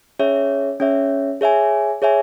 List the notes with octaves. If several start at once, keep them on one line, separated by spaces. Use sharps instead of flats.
C#4 G#4 C#5 E5
C#4 G#4 C#5 E5
G#4 C#5 E5 G#5
G#4 C#5 E5 G#5